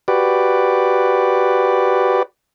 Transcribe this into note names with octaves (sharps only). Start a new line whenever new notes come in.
F#4 G4 B4 D5